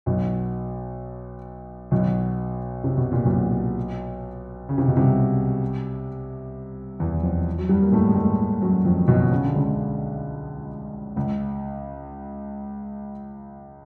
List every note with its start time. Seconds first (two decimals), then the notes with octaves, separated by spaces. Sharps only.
0.06 B1 B2
1.91 B1 B2
2.84 C3
2.97 B2
3.12 A#2
3.25 B1 B2
4.69 C#3
4.78 C3
4.88 B2
4.97 C2 C3
7.00 E2 E3
7.23 F2 F3
7.58 F#3
7.69 G2 G3
7.82 A#3
7.92 A2 A3
8.09 G#3
8.15 A2 A3
8.61 F#2 F#3
8.85 F2 F3
9.08 B1 B2
9.32 C#3
9.44 D3
9.55 C#2 C#3
11.16 C#2 C#3